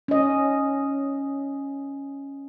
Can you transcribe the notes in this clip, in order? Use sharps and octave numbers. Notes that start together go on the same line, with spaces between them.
C#4 D#5